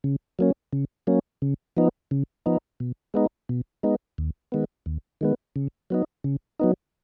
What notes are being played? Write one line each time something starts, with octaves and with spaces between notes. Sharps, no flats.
C#3
F#3 A#3 C#4
C#3
F#3 A#3 C#4
C#3
F3 B3 D#4
C#3
F3 B3 D#4
B2
G#3 B3 D#4
B2
G#3 B3 D#4
D#2
D#3 G#3 B3
D#2
D#3 G#3 B3
C#3
F#3 B3 D#4
C#3
F#3 B3 D#4